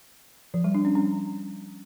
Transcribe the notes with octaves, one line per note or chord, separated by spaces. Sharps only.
F3
G3
D4
C#4
C#4